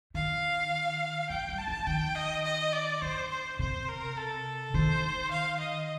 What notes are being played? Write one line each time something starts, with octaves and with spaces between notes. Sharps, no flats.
D#3 F5
F3 G5
G3
A5
F3
D#3 G5
D#5
D#5
D5
D3 C5
C5
C3 C5
A#4
A4
D#3 C5
F5
D#5